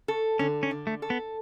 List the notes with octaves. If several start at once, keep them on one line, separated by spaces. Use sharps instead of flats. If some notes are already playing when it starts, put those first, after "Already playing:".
A4
D3 C#4
C#4
D3
A3
A4
B3